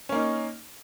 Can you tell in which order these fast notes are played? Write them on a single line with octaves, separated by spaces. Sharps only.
C#4 A#3 D#4